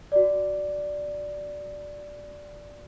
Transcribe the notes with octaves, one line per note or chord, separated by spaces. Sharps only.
F#4 D5